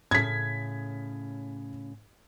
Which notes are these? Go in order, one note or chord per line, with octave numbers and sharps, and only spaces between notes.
A2 C#3 G#6 B6